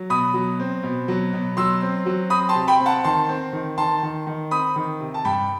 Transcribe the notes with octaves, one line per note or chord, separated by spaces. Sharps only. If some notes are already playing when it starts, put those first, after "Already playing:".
Already playing: F#3
B2 B5 D#6
F#3
C4
B2
F#3
B2
F#3 C6 E6
C4
F#3
C4 B5 D#6
A5 C6
C3
G5 B5
C4
F#5 A5
D#3 A5 C6
C4
D#3
D#3 A5 C6
D#3
D#3
C4 B5 D#6
D#3
C3
A5
G2 G5 B5